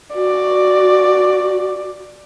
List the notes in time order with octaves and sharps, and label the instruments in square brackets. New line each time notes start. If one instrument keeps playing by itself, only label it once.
[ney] F#4 [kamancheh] D5